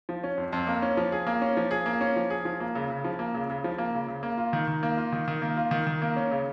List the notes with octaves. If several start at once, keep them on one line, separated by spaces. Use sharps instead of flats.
F3
C#4
F2
F2
A#3
C#4
F3
G#4
A#3
C#4
F3
G#4
A#3
C#4
F3
G#4
F3
A#3
C#3
C#3
F3
A#3
C#3
C#3
F3
A#3
C#3
C#3
A#3
F4
D#3
D#3
A#3
F4
D#3
D#3
A#3
F4
D#3
D#3
A#3
C#4
C#3